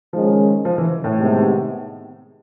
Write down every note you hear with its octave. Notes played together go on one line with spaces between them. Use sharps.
D#3 F3 G#3 C#4
F3
E3
A2
C3 D#3 G#3 B3